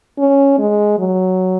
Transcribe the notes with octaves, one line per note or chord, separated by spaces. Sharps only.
C#4
G#3
F#3